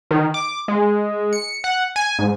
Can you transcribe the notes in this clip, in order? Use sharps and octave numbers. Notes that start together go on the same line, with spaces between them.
D#3
D6
G#3
C#7
F#5
G#5
G#2